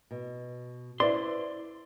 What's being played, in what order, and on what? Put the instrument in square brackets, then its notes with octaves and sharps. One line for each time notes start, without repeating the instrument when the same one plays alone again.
[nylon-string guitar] B2
[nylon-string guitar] E4 B4 C5 [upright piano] D5 [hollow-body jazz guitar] C6